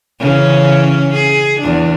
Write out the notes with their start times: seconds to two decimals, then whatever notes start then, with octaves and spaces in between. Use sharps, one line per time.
0.20 C#3 E3 C#4
1.13 G#4
1.59 E2 D4